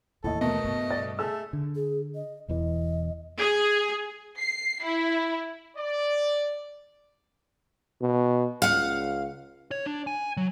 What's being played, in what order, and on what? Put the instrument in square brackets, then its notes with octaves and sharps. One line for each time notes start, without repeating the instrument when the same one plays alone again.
[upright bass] D#2 E3 [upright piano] A2 D#5 [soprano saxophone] A4
[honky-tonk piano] B2 A3 [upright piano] A#4 A5 [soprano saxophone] D#5
[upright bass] G2 C#3
[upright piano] D5 A6
[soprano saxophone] A3 [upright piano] G#4 A4 E6
[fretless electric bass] D3
[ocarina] G#4
D#5
[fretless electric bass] E1 E2 E3 [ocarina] D#5
[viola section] G#4
[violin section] C7
E4
[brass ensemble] D5
[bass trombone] B2
[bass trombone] C#2 [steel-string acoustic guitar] F5 F#5
[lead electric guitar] C#5
D4
G#5
F#3